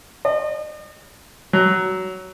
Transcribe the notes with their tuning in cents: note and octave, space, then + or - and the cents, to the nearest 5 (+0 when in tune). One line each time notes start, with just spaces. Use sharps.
D#5 -40
F#3 +15